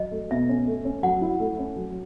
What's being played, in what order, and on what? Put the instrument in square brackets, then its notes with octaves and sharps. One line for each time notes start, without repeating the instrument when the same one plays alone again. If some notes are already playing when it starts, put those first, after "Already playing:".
Already playing: [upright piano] F#3 [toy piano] D#5
[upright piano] A3
[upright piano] B2 [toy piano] E5
[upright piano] C#4
A3
C#4
[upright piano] F#3 [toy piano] F#5
[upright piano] E4
A3
C#4
F#3